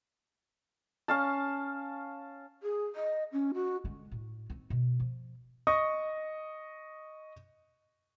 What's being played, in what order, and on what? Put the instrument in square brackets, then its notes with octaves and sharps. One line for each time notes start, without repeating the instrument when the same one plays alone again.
[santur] C#4 F5 A5
[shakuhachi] G#4
D#5
C#4
F#4
[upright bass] D3 G#3
A2
C4 D#4
B2
F3
[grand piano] D#5 C#6 D#6